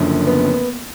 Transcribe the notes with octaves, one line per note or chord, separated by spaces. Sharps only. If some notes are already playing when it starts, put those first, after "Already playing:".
Already playing: F#1 F#2 D3 F3
B3